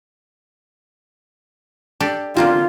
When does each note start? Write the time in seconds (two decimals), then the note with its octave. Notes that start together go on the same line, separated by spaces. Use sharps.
2.00 D4 G4 A4
2.37 D3 A#3 C4 F4